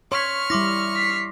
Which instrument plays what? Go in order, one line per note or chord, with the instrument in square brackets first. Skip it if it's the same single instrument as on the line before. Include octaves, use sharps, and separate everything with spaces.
[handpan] C#5 [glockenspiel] C6 B6 [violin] C#6 F6
[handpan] G3 E4 [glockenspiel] C6 D6 A#6
[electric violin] B6 C7